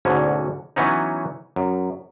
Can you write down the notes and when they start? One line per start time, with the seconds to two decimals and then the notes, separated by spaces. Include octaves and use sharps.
0.05 D2 G#2 B2 D3 C#4
0.76 E3 F#3 B3 C#4 D#4
1.56 F#2